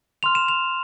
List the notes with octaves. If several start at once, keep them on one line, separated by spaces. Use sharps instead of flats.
C6 F6 F7
E7
F7